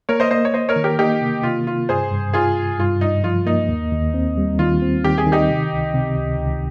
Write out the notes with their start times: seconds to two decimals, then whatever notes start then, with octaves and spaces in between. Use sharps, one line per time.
0.09 A#3 A#4 C#5
0.20 C5 D#5
0.31 A#3 C5 D#5
0.45 C#5
0.54 A#3 C5 D#5
0.69 A#4 C#5
0.76 D#3
0.84 G4 A#4
0.99 A#3 D#4 G4
1.21 C3
1.43 C3 F4
1.67 C3 F4
1.89 G2 G#4 C5
2.12 G2
2.34 G2 F4 G#4
2.57 G2
2.79 G2 F4
3.01 G2 D#4
3.24 F3 F4
3.46 A#3 D#4
3.69 D#2
3.92 D#2
4.14 C4
4.37 G3
4.59 D#3 F4
4.82 C4
5.04 D#3 G4
5.18 G#4
5.27 D#3
5.32 D#4 G4
5.50 C3
5.73 C#2
5.94 C3
6.17 C#2
6.39 C#2